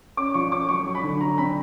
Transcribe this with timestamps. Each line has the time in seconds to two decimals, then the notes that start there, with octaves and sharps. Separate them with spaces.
0.17 C#4 D6
0.34 F3 C#6
0.51 C#4 D6
0.69 F#3 C#6
0.87 F#3
0.95 B5
1.03 D3
1.21 F#3 A#5
1.38 C4 B5